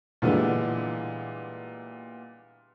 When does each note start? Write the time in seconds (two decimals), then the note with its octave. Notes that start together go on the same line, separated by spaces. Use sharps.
0.22 A#2 D3 E3 G3 G#3 B3